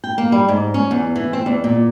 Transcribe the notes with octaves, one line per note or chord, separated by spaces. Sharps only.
G5
A#3
G3
G#2
C#4
E2
E3
C4
E2
A#2